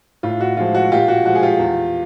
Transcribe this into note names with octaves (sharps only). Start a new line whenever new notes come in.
A2 F4
F#4
F3 G#3 F4
F#4
A#2 F4 G4
F#4
F3 G#3 F#4
G#4
F4 G4
E2